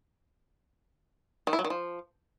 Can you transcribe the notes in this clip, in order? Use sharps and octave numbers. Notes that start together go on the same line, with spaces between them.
D#3
E4
F#3
D#3
F3